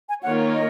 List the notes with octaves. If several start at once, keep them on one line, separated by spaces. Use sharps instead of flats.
G#5
D#3 A#3 F4 A#4 C#5 F#5
D#5